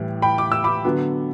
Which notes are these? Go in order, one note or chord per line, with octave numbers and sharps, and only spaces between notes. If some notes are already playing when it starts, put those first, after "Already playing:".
Already playing: A2 E3 G3
G5 B5
D6
E6
B5 D6
D3 F#3 B3